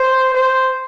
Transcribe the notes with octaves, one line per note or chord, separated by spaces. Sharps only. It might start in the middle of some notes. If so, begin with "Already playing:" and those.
Already playing: C5
C5